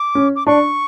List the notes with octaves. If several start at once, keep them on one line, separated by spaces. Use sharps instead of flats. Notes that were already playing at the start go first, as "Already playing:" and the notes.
Already playing: D6
C#4
D6
D4 C#6